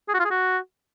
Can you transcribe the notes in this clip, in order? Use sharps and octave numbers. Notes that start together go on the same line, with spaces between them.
G#4
F#4
F4
G#4
F#4